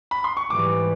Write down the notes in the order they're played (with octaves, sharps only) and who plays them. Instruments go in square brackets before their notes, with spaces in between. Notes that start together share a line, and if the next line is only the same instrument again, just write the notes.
[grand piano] B5
C6
C#6
[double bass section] G#2 E3 G3 [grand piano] D6